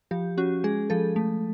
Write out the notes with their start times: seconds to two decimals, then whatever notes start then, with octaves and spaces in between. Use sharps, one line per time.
0.11 F3 G4
0.38 C#4 F#4
0.64 G#3 G#4
0.90 F3 A4
1.16 A3